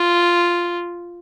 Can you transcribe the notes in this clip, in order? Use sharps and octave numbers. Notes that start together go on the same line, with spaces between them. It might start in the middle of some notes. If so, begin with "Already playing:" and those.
Already playing: F4